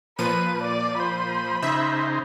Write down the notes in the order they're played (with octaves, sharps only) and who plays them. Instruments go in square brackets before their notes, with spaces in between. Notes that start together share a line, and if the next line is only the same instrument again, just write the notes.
[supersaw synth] A#2 F3 D#7 [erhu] B4
[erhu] D5
[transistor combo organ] C5 [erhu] B5
[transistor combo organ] C#3 D#4 C5 [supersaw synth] E5